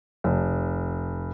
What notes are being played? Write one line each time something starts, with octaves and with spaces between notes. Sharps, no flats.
F1